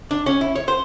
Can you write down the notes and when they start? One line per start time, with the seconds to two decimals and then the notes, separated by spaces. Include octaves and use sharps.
0.11 D4
0.26 C#4
0.41 E4
0.55 C#5
0.68 C5